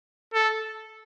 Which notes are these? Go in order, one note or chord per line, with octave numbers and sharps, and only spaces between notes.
A4